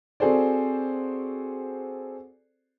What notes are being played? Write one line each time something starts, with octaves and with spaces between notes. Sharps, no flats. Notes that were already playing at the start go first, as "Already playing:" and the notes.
C4 F#4 G#4 A4 C5 D5